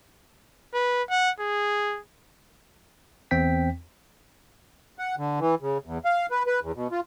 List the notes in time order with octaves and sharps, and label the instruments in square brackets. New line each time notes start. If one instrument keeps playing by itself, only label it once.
[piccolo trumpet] B4
F#5
G#4
[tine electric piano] E2 C4 G5 B6
[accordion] F#5
D3
E3
C#3
E2
F5
B4
B4
E2
B2
F4